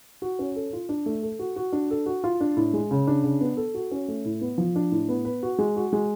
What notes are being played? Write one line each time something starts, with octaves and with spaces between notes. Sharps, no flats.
F#4
C#4
A4
F4
D4
A3
A4
F#4
F#4
D4
A4
F#4
F4
D4
A2
G#3
C#3
D4
C#3
B3
A4
F#4
C#4
A3
A2
B3
F3
D4
A2
B3
B4
F#4
G#3
F#4
G#3